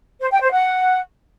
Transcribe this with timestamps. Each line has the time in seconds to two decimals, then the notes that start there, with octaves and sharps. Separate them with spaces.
0.20 C5
0.31 G5
0.41 C5
0.52 F#5